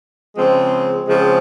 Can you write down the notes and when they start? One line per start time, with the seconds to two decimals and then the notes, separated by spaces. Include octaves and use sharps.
0.36 C#3 F3 G#3 C4
1.07 C#3 F3 G#3 C4